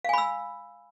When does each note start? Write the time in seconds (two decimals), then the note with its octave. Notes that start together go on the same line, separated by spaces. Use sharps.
0.05 F5
0.09 G#5
0.13 B5
0.18 E6